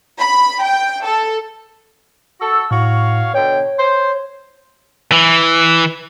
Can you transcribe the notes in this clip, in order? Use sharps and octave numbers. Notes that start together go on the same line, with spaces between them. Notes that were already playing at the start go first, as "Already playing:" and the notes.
B5
G5
A4
F#4 A4 E6
A2 F#4 C#5 F5
B2 D3 C#5 G5
C5
E3